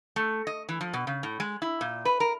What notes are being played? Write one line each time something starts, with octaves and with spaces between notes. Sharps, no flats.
A3
D#5
E3
F3
B2
C#3
A2
G#3
E4
A#2
B4
A#4